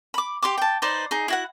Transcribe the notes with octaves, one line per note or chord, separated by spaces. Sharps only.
B5 D6
G4 C6 D6
G5 A5
D#4 B4 C5 D5
D#4 G#4
E4 F#4 F#5